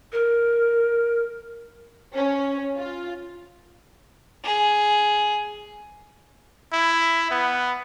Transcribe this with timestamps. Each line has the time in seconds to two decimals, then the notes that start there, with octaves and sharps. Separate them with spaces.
0.13 A#4
2.14 C#4
2.77 F4
4.44 G#4
6.73 E4
7.31 B3